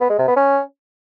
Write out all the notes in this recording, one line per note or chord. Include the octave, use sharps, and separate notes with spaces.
B3
G#3
C3
B3
C#4